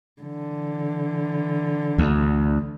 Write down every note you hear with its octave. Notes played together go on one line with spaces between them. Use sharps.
D3 E3
D2